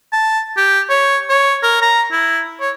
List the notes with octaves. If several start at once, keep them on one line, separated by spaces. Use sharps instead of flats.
A5
G4
C#5
C#5
A#4
A#5
E4
C#5